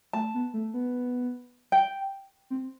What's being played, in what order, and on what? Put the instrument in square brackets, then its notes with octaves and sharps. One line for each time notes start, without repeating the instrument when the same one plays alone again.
[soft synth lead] A3 [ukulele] A5
[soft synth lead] B3
A3
B3
[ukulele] G5
[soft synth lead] C4